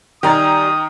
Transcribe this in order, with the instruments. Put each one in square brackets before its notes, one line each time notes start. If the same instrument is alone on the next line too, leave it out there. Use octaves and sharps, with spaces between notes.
[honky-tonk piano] D#3 A#5 A6 [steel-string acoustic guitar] G3 G#5 [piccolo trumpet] D#6